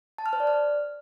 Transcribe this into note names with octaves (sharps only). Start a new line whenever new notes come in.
A5
F6
C5
D5
F6